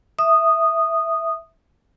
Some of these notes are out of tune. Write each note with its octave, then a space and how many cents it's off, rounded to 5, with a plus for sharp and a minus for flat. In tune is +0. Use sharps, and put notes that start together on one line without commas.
E5 +0 D#6 -10